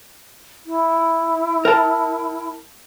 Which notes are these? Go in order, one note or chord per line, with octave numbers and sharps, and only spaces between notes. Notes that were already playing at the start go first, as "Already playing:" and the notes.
E4
A#4 G5 A5